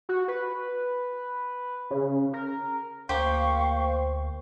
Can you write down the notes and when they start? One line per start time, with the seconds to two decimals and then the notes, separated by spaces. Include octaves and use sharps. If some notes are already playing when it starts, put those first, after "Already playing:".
0.09 F#4
0.28 B4
1.91 C#3
2.33 A#4
3.09 D2 A#3 G4 C5 F5 C#6